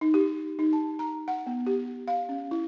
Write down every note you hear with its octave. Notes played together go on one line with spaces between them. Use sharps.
D#4
G4
D#4
A5
A#5
F#5
B3
G4
F5
C#4
E4